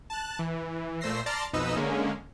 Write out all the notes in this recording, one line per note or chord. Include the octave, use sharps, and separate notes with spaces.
A5 F#6
E3
A#2 A3 C5 E6 A#6 C7
D5 A5 A#5 C6 F6 A6
B1 F2 D#4 B4 D#5 E6
D3 G#3 A#3 C#4